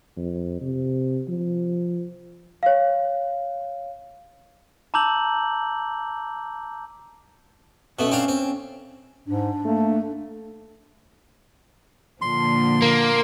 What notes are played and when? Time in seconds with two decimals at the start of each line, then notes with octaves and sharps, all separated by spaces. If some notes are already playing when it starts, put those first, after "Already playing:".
0.17 F2
0.61 C3
1.29 F3
2.63 C#5 F5
4.94 A5 A#5 D6 E6 G6 F#7
7.99 B2 A3 C#4
8.11 C4 D4 F5
8.28 C4
9.28 G#2 D4
9.65 A3 A#3
12.22 A#2 D3 F3 C6
12.82 A#3